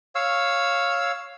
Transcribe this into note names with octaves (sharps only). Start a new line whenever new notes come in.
C#5 F5 E6